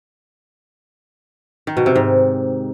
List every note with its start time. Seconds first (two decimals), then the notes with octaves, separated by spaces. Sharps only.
1.67 D#3
1.77 B2
1.86 C3
1.96 G#2